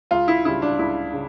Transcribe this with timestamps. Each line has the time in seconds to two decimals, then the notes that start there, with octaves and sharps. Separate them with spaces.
0.11 C#2 F4
0.28 E4
0.45 C#3 G3 E4
0.62 D4
0.79 C#2 E4
1.13 C#3